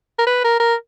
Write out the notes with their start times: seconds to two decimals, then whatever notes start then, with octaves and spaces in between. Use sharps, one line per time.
0.19 A#4
0.27 B4
0.44 A#4
0.60 A#4